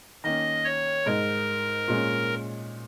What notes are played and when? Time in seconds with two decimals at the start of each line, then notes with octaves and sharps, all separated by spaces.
0.24 D#3 A#3 C#4 D#5
0.64 C#5
1.06 G#2 G#3 D#4 A#4
1.88 A#2 G#3 C#4